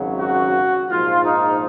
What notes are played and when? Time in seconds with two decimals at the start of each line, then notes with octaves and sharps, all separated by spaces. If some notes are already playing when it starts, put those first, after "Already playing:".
Already playing: G#1 F#2 C#3 F#3
0.18 F#4
0.90 A#1 G#2 F3 F4
1.26 D#4